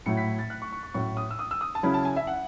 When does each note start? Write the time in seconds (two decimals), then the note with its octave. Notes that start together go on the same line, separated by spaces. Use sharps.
0.06 A2 F#3 A3 E4 C#7
0.17 B6
0.39 A6
0.50 F#6
0.62 C#6
0.72 C#6
0.83 C#6
0.94 A2 F#3 C#4 C#6
1.17 D#6
1.31 E6
1.39 D#6
1.51 E6
1.61 D#6
1.75 A5
1.83 C#3 F#3 C#4 E4 B5
1.94 A5
2.05 G#5
2.16 E5
2.27 F#5